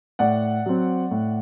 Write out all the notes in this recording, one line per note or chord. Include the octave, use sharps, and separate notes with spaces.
A2 D5 F#5
F#3 C4
A2